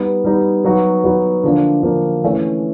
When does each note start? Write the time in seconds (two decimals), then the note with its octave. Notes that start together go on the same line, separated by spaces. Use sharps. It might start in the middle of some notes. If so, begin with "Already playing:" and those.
Already playing: G3 B3 D#4
0.24 G3 B3 D#4
0.65 F#3 B3 D#4 F#4
1.04 F#3 B3 D#4 F#4
1.44 D3 F3 A#3 D4
1.83 D3 F3 A#3 D4
2.24 E3 A3 C#4